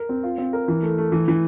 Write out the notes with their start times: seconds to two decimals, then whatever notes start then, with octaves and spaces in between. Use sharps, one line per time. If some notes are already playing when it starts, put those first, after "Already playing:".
Already playing: A#4
0.09 C4
0.23 F4
0.38 C4
0.53 A#4
0.68 E3
0.82 A3
0.98 A3
1.12 E3
1.28 E3